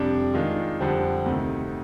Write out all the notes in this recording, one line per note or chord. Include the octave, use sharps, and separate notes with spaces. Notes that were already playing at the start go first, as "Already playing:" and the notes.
Already playing: F2 C3 G3 D4
D#3 G#3 D4 F4
F2 D3 G3 C4
D2 C3 D#3